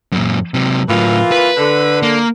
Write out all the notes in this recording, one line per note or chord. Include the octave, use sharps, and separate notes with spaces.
F#2 A#2
C3 F#3
A2 E3 F#3 A#3 F4
B4
D3
A#3